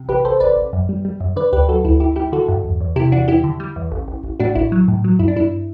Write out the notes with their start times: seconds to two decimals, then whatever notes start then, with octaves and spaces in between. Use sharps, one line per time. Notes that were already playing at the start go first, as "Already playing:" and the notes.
Already playing: C3
0.08 A1 G4 B4
0.24 A1 A4 C5
0.40 A1 B4 D5
0.57 A1
0.73 F#2
0.89 G3
1.05 G3
1.20 F#2
1.36 D3 B4 D5
1.53 D2 G4 B4
1.68 F#3 F#4 A4
1.85 D2 E4
2.00 G1 E4 G4
2.16 G3 E4 G4
2.32 D3 F#4 A4
2.48 G2
2.65 E2
2.81 E2
2.96 C3 E4 G4
3.12 E2 D4 F#4
3.28 E2 E4 G4
3.44 D3
3.60 G3
3.76 E2
3.92 A1
4.08 A1
4.23 A1
4.40 A2 D4 F#4
4.55 A1 E4
4.72 F#3
4.88 A2
5.04 F#3
5.19 G2 E4
5.28 D4
5.36 G2 E4